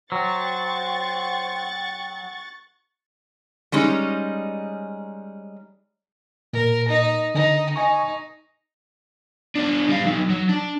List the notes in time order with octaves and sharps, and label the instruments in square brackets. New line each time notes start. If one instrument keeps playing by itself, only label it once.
[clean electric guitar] F#3 [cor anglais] C5 [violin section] F#5 C#6 A6 [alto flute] G5
[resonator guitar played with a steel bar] G3 G#3 C#4 D#4
[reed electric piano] A#2 [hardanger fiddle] A#4
[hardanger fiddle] D#4
[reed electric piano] D3 [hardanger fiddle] D#4
[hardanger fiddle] D#4 [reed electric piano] G#5 C#6
[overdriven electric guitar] B3 D4
G3 F5
F#3 D#4
F#3
D4